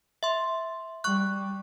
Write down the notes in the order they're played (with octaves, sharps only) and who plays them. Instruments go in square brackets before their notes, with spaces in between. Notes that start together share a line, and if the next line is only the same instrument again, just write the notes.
[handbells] E5 C6
[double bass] G3 [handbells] C#6 F#6